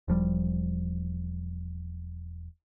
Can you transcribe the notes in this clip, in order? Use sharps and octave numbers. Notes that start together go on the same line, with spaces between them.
E1 F3 G3